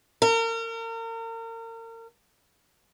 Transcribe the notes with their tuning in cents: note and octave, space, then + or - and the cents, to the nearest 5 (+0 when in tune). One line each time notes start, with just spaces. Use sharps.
A#4 -35